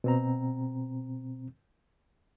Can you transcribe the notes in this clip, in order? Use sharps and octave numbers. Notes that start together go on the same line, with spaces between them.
B2 C4 A#5